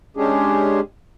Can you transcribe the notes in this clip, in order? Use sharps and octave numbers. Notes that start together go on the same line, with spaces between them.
G#3 C#4 D4 G4 G#4